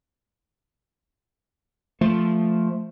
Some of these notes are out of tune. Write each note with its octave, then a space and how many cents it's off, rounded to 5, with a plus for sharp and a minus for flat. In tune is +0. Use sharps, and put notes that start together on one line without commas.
F3 +0 A3 +0